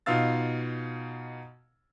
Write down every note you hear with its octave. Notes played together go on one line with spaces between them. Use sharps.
B2 D#4 F4 F5 E6 A6